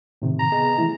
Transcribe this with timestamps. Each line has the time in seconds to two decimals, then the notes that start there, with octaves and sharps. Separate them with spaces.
0.22 A2 C3 D#3
0.40 A#5
0.52 B3 G#4 D#5
0.78 E3 A3 E4